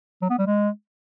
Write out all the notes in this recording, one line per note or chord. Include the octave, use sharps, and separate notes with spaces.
F#3
B3
G3
G#3